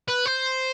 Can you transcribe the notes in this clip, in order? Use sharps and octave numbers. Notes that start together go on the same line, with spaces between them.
B4
C5